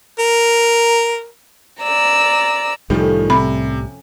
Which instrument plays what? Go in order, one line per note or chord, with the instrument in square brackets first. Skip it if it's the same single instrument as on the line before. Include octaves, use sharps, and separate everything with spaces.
[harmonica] A#4
[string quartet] D5 A#5 E6
[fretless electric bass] C2 A2 G3 [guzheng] F2 A3 C#4 [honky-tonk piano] D#3 F3
[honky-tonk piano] C3 [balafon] B5